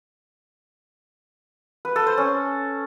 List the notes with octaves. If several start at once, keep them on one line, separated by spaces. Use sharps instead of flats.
B4
A4
C5
C#4